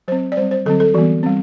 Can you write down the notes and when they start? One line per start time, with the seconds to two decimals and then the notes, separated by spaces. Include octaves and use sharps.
0.08 F#3 C4 C5
0.32 D5
0.37 G3 C4 C5
0.51 C5
0.66 D3 F#3 C4 A4
0.80 A4
0.94 E3 G3 B3 F#4
1.23 G3 C4